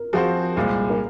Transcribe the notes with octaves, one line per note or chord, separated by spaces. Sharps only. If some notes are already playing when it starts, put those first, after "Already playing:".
Already playing: A#4
F3 C4 F#4 G#4 C5
C2 A#2 G#3
A#4